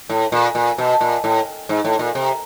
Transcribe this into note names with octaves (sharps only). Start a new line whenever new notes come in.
A2
A#2
A#2
B2
A#2
A2
G#2
A2
A#2
C3